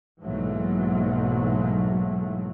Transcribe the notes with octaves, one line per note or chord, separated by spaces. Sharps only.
B1 G#2 E3 F#3 A3 A#3